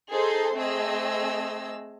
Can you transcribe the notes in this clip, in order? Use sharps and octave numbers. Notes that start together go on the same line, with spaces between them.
D#4 G#4 A4 C5 C6
A3 C4 G#4 D#5 E6